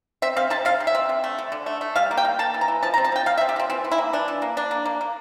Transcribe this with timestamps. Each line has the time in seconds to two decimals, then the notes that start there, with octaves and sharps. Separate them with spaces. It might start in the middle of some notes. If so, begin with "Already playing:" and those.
0.22 C4 E5
0.36 C4 F5
0.50 C3 A5
0.65 C3 F5
0.80 C3
0.87 E5
0.95 C4
1.09 D3
1.24 A3
1.39 D3
1.52 D3
1.66 A3
1.81 A3
1.96 G3 F5
2.11 A#3
2.17 G5
2.25 A#3
2.39 A#3 A5
2.54 E3
2.61 A#5
2.68 E3
2.83 F3 A5
2.94 A#5
2.98 C4
3.04 A5
3.12 F3 G5
3.26 F3 F5
3.38 E5
3.41 C4
3.49 G4
3.56 F3 C4
3.70 E3 C4
3.84 E3
3.91 E4
3.98 A#3
4.13 E3 D4
4.28 E3
4.42 A#3
4.57 A#3 D4
4.71 A#3
4.85 A#3
5.01 A#3